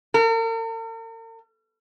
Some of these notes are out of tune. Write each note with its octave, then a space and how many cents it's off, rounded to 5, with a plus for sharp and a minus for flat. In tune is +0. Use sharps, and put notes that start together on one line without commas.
A#4 -45